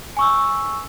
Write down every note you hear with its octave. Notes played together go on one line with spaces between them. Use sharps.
G#5 C#6 E6